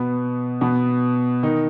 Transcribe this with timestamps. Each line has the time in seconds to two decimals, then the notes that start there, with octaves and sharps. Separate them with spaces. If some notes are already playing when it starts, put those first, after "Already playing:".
Already playing: B2 B3
0.61 B2 B3
1.43 D#3 D#4